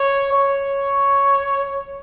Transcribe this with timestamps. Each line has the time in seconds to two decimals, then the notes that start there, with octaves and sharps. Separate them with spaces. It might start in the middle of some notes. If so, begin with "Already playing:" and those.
Already playing: C#5
0.32 C#5